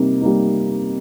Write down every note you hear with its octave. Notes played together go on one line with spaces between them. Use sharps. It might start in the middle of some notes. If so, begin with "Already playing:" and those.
Already playing: C3 G3 A#3 D#4
G3 A#3 D#4